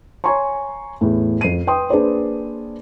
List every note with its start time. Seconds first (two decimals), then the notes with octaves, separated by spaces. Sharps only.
0.24 C#5 G#5 A#5 C6 C#6
1.01 E2 A2
1.41 F2 C7 D#7
1.67 B4 G5 C6 D#6
1.90 A#3 D4 G#4 B4 C5 D5